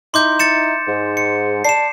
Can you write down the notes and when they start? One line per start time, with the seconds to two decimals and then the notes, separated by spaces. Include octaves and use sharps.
0.14 D#4 E4 C6 D6 G6
0.39 A6 C#7 E7
0.87 G#2
1.17 C#7
1.65 D5 A5 C7 E7